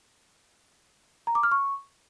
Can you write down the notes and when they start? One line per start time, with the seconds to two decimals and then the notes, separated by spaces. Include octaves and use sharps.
1.27 A#5
1.35 D6
1.43 F6
1.52 C#6